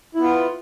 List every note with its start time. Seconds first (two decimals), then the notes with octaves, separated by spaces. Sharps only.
0.15 E4
0.19 B3
0.24 F4